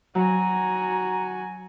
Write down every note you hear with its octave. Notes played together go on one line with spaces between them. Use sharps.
F#3 F#4 G#5 A#5